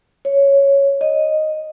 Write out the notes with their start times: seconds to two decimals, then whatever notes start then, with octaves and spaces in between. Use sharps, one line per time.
0.25 C#5
1.01 D#5